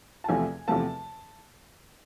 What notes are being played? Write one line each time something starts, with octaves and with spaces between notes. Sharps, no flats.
A5
E2 C3 F3 A3 G#5
E2 C3 F3 A3 A5